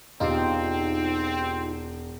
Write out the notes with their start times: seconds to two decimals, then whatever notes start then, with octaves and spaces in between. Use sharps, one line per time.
0.20 E1 C4 D#4 F4 G4